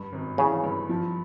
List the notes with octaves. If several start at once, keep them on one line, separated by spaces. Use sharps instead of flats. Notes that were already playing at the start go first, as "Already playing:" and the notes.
Already playing: G2
G#1
C#3 E3
G2
F3